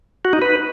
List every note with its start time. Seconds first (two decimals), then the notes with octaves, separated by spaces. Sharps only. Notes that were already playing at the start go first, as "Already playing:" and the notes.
0.25 F#4
0.33 D#4
0.42 B4